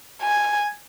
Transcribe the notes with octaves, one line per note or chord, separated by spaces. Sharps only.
G#5